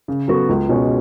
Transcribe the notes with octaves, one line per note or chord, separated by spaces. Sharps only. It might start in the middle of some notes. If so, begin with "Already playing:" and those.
C#3
F#3 B3 F#4 A4
C#2
B2 G#3 C#4